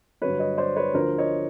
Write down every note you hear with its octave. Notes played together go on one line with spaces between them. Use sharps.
G2 D3 F#3 B4 C#5
C#5 D#5
C5 D5
B4 C#5
D2 D3 F3 A#4 C5
C#5 D#5